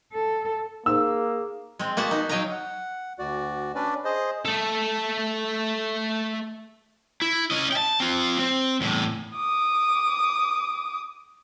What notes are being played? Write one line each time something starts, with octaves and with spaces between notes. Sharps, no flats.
A4
A#3 D#4 G#4 C5 E6
G#3 C4
A#3 B3 F#4 F#5 A5
B3 D#4
F#3 C#5 D#5 F5 G5 A#5
F#5
D2 F#4 D5
C#4 D4 B4 D5
G#4 C5 D#5
A3 A4
E4
C#4 D#5
G5 A5
C4 F4
C4
E2 A2
D6 D#6